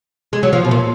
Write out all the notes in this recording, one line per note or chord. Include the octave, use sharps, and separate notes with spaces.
G#3
F#3
F3
B2
A#2